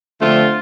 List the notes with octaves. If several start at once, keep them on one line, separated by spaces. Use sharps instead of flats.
D3 F3 A3 C4 F4